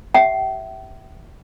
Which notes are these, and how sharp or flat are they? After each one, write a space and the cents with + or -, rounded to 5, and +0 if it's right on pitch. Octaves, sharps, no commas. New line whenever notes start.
G4 -15 E5 +0 G5 -40